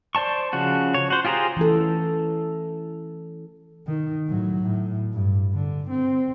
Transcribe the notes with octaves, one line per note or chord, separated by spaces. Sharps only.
C5 D5 A5 C#6
C#3 F3 F#4
C#5
F#4 C5
F4 G4 G#4 C5 A#5
E3 C#4 A4
D#3
A2 F#3
A2
G2
D3
C4